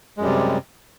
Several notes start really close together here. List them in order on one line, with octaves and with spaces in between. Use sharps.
G#3 F#2 G3 C3